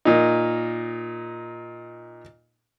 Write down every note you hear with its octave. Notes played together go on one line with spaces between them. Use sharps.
A#2 D#4